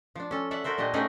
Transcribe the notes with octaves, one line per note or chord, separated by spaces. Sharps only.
F3 D4
C#4 A4
A4 B4 D5 E5 F#5
F#4 A4 A#4 C5 E5
A#2 D4 F#4 G4 D#5
A3 B3 C#4 D#4 G#4 A#4